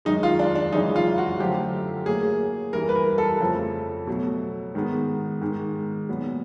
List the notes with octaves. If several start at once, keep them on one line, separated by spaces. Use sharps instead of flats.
F#2 D#3 G#3 D#4
F4
D4
D4
F#2 C#3 E3 G#3 D#4
F4
F#4
F#2 D3 F3 A3 G4
A2 F#3 A#3 G#4
G2 E3 G3 A#4
B4
A#4
A4
F2 C#3 F3 A3
B2 F#3 A3
G#2 D#3 G#3 B3
G#2 D#3 G#3
A#2 F#3 B3